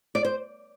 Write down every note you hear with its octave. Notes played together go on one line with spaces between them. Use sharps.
D5
C5